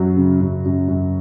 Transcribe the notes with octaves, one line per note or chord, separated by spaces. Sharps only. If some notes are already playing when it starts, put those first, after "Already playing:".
Already playing: F#2 F#3
C#3
F#2
F#2
F#2